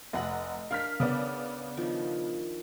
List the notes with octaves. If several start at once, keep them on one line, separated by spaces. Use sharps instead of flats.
F1 D#5 F#5 A#5 B5
D4 A#4 F5 F6 B6
C#3 B3 D5
D#3 F3 D4